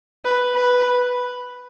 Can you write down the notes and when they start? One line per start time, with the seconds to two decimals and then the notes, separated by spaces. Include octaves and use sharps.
0.25 B4
0.55 B4